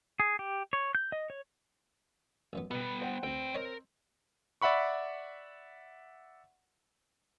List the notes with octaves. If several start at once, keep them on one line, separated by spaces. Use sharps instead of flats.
G#4
G4
C#5
G6
D#5
C#5
A1 F#2 B3
B2 G3 B3 B4
C5 F#5 G5
D2 C4 B4 G5
A#4 C#5 D#5
D5 E5 F#5 B5 C#6